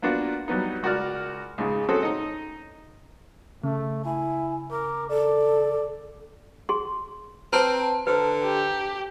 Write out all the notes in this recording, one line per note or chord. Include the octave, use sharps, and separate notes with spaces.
A#3 B3 D4 F4 F#4
F#3 G3 B3 D#4
C#2 F#4 A#4 D5 F6
C#2 G#2 C#3
C4 C#4 F#4 G#4 A4
D#4 D#5
C#3 A3
E4 G#5
A#4 D6
A4 D5
G#4 C6
C4 B4 C5 A5 A#5
D3 B4 C5
G4